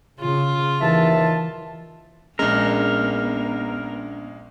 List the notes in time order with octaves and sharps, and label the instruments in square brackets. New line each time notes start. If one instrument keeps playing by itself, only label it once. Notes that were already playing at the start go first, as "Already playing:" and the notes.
[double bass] C#3 [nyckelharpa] F4
[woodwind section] D#2 E5 A5 [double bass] E3
[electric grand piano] A#1 G#3 [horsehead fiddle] B3 [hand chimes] C#4 D4 [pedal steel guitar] A#4